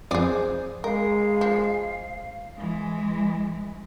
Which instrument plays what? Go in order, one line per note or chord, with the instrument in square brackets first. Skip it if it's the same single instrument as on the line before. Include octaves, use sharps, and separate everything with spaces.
[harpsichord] F2 C4 D#6 [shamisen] G#4 D5 [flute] C5
[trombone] G#3 [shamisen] A#4 [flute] F5
[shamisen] F3
[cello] E3 G#3